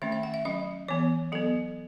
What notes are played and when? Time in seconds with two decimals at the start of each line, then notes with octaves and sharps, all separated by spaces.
0.02 D#3 A3 C#4 E5
0.12 E5
0.23 F#5
0.34 E5
0.45 F#3 C#4 D#5
0.88 E3 B3 C#5
1.32 F#3 B3 A4